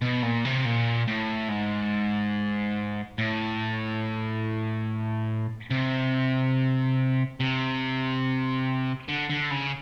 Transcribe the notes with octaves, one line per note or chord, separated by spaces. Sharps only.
B2
A#2
C3
A#2
A2
G#2
A2
C3
C3
D3
D3
C#3